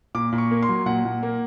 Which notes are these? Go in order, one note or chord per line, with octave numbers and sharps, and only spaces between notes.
A#2 D6
A#2
C#6
A#3
C6
F#3
A#2 F#5
A#2
A#3